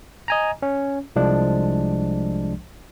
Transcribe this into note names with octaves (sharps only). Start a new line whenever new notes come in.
D#5 G#5 A#5
C#4
C2 F3 G#3 D4